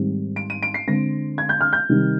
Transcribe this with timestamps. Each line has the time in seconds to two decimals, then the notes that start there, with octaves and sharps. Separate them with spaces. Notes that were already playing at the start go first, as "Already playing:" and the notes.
Already playing: G#2 D#3 G3 C4
0.36 D7
0.50 D#7
0.63 D7
0.74 C7
0.87 D3 G#3 C4 A#6
1.38 G#6
1.49 G6
1.61 F6
1.73 G6
1.89 C3 D#3 G3